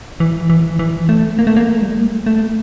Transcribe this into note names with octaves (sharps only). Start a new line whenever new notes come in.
E3
E3
E3
A3
A#3
A3
A#3
A3
G3
A3
A#3
A3